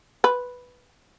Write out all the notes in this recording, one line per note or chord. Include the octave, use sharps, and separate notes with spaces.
B4